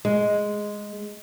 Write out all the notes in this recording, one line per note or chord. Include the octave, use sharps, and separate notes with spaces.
G#3